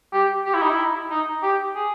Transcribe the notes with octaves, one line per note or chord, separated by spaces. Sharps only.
G4
G4
E4
D#4
E4
D#4
G4
G#4